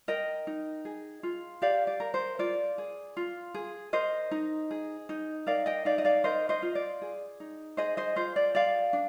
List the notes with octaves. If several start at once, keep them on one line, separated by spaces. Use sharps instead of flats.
A#4 D#5 G5
D#4
G#4
F4
G4 D5 F5
D5
A#4
C5
F4 D5
G#4
F4
G#4
A#4 C5 D#5
D#4
G#4
D#4
A#4 D5 F5
D#5 G5
D#4 D5 F5
D#5
D5 F5
A#4 C5 D#5
C5 D#5
F4
D5
G#4
D#4
G#4 C5 D#5
C5 D#5
F4 C5
D5
G#4 D5 F5
D4